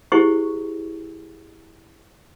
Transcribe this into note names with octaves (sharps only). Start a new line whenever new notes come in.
E4 G4 G#4 C5 C#6